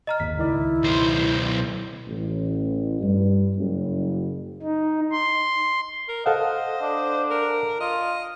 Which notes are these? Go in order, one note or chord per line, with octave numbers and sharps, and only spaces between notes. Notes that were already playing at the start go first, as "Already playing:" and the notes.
D#5 A#5 F6
G#1 D#2 B6
C#2 D#3 E4 D5
B1 C5
A1
G2
F#1
D#4
C6
A#4
A4 C5 D#5 F5 F#5
D4
A#4
F4 D#5